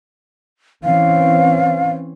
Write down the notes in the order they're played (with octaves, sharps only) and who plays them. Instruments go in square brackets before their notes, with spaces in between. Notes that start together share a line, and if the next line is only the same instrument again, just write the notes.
[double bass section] E3 C4 C#4 [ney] F5